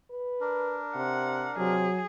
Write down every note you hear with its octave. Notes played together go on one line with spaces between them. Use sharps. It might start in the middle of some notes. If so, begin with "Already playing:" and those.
B4
D4 A#4
C3 F#5
C3 F#3 G#4